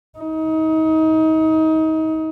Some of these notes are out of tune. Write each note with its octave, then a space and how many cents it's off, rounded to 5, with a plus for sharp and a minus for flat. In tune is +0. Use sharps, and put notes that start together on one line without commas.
D#4 +30